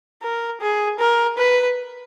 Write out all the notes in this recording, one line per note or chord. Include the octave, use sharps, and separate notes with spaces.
A#4
G#4
A#4
B4